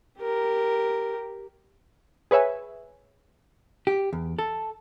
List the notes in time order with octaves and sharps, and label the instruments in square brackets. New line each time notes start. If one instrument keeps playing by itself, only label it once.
[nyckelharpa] G4 A#4
[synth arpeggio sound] G#4 B4 C#5 E5 G#5
[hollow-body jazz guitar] G4
E2
A4